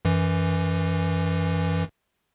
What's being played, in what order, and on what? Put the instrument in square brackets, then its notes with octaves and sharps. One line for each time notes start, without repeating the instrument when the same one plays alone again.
[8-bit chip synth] F#2 E3